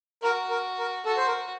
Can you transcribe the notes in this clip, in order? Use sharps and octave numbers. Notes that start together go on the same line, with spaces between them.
F#4 A#4
A#4
A#4
F#4 A4
C5
A#4